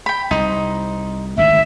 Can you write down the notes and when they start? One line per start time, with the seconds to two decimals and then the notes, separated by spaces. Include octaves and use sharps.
0.06 G5 B5
0.31 C2 D#4 C5
1.37 G#1 D2 D#3 E5